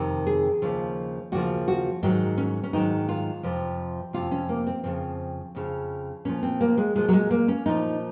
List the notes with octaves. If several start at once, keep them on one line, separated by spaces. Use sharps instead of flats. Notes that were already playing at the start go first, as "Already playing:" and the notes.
Already playing: F2 C3 D#3
G#4
D#2 C#3 F3
D#2 C#3 F3 F#4
F#4
G#2 D#3 F#3 D#4
C#4
C#4
G#2 D#3 F#3 D#4
F4
F2 C3 F3
F2 C3 F3 F4
C#4
A#3
C4
F2 C#3 F3 C4
F2 C#3 F3
A#2 F3 C#4
C4
A#3
G#3
A#2 F3 G#3
F#3
G#3
A#3
C#4
A#2 F3 D#4